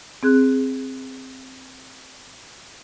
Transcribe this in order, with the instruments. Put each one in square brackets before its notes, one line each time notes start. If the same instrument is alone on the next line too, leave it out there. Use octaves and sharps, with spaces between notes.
[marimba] C4 G#4 F#6